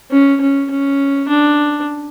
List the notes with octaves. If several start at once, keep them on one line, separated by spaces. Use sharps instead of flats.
C#4
C#4
C#4
D4